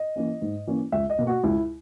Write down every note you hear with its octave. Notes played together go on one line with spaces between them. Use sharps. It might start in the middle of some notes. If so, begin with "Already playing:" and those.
Already playing: D#5
E3 A#3 C#4
G#2
E3 A#3 C#4
C#2 E5
D#5
B2 A#3
F#4
C#2 E4